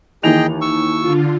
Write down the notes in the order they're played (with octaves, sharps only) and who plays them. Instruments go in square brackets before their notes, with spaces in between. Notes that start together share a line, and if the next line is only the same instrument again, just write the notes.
[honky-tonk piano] D#2 E3 F7 [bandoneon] G#4 D#5 G5
[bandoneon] C#6 E6
[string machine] D3 F4